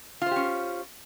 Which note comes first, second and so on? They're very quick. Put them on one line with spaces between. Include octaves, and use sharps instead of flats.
F4 C5 G4 C#4